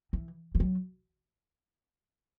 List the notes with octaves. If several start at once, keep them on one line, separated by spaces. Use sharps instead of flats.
E3
E3
F#3